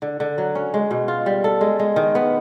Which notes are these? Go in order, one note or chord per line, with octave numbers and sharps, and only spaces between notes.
D3
D3
F#3
C#4
G#3
B2
F4
G3
A4
G#3
G#3
D#3
B3